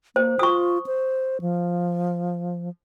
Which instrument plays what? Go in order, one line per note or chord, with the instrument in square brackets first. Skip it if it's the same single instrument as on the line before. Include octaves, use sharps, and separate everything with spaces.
[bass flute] A#3 [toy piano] C5
[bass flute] F4 [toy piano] C#6 D#6
[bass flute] C5
F3